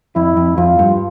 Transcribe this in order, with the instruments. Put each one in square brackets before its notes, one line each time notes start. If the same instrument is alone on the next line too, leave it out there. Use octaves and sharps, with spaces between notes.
[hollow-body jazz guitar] F2 [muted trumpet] E4
[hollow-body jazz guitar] F2
[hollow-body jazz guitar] F2 [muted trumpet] F4
[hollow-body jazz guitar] G2